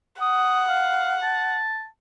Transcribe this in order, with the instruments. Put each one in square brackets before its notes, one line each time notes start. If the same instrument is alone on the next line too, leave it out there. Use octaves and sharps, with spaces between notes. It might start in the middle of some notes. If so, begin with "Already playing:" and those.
[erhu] F#5 [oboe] D#6
[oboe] F5
A5